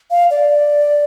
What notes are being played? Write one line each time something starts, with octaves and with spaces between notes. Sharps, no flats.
F5
D5